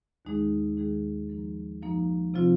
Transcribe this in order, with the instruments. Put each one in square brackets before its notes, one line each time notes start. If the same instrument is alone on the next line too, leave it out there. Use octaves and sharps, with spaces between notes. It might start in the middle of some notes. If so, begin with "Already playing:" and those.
[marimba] D#2 D#3 G#3 D#4 G#4
D#2 D#3 G#3 D#4 G#4
F#2 F3 A#3 D#4
F#2 F3 A#3 D#4
C3 F3 C4 F4